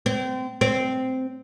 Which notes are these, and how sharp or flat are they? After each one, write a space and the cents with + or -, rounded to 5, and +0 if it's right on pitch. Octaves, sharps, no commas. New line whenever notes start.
C4 -30
C4 -10